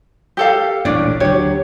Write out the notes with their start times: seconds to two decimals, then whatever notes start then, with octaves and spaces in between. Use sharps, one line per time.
0.37 G4 A4 F5
0.85 D#1 A1 A2 C#4 D4 D5
1.20 D2 D3 F#3 G4 C#5